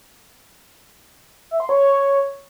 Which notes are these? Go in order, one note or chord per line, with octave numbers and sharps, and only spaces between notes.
E5
C6
C#5